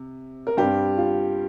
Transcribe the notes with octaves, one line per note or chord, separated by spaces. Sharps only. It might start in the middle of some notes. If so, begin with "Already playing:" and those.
Already playing: C3
A#4
G2 G3 C4 G4
F4